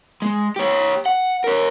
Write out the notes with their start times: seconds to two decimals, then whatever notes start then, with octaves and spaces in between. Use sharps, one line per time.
0.22 G#3
0.56 G4 C#5
1.06 F#5
1.44 A#4 C#5